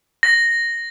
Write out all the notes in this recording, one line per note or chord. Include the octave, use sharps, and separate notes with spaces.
A#6